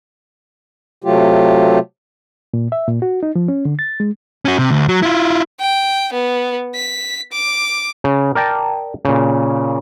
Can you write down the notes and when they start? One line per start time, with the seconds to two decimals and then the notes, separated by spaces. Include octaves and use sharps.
1.04 C3 F#3 A3 F4 G4
2.54 A#2
2.72 E5
2.88 A#2
3.02 F#4
3.23 D#4
3.36 F3
3.48 C#4
3.65 D3
3.79 A6
4.00 G#3
4.45 C#4 F#4
4.59 C3
4.70 D2
4.88 F#3
5.02 E4 F4
5.60 G5
6.13 B3
6.75 B6
7.32 D6
8.04 C#3
8.35 A#4 D5 G5 A5
9.05 A#2 C#3